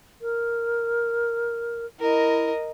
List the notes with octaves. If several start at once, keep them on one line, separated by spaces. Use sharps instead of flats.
A#4
E4 A#4 D#5